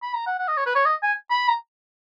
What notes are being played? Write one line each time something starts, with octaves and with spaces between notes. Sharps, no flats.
B5
A#5
F#5
F#5
D#5
C#5
B4
C#5
D#5
G#5
B5
A#5